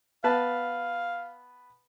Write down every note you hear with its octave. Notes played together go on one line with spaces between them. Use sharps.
B3 B4 F5 A5